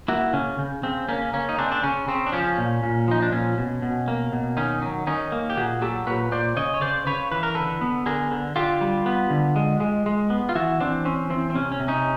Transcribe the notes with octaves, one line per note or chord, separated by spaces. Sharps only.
A#3 E4 F#4
C#3 C#4
C#3
C#3 C4
A#3 C#4
A#3 C#4
D#4
C#3 C4 D4
D4
C#3 C#4
C#3 C4
D4
F3 C#4
A#2
A#2
F3 D#4
D4
A#2 C#4
B2
B2
A#3
B2
D#3 C#4 D#4
F#3
D#3 C#4 D#4
A#3
G4
A#2 F#4 G#4
F#3 G4 A4
A#2 B4 C#5
A#2 C5 D5
C#3 C#5 D#5
C#5
C#3 C5 D5
C#3 B4 C#5
E3 B4
A#4
D3 A4 B4
B3
D3 G#4 A#4
D3
D3 F4 G4
G3
B3
D3
G#3
G#3
G#3
B3
F4
E3 E4 F#4
E3 C4 D4
C4 C#4
E3 C4
C4
C3 C#4
C#4
C3
C#4 D#4